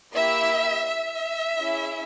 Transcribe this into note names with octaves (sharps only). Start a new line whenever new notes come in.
A#3 E4 G4 E5
E5
C#4 E4 G#4